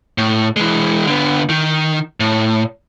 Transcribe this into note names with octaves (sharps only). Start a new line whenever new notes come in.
A2
E3 G#3
D3 B3
D#3
A2